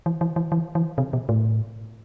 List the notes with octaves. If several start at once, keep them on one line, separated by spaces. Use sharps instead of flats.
E3
E3
E3
E3
E3
C3
B2
A2